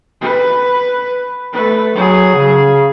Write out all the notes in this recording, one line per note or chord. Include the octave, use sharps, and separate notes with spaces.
B4
A3 B4
F#3 G#4
C#3